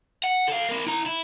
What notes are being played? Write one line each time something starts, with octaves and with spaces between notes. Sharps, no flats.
F#5
A4 F5
C4 A#4
E4 A#5
E4